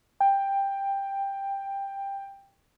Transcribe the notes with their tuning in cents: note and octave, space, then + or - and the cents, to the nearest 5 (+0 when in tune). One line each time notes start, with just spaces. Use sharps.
G5 +10